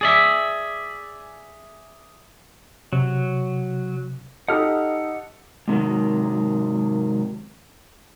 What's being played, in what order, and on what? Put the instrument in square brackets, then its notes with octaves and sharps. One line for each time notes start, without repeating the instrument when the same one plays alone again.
[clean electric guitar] G#4 D5 E5
[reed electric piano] C3 [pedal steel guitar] F#3
[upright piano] D#4 G4 A4 [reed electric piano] D#5 [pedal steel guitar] F#5 F6
[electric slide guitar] G#2 C3 D#3 F#3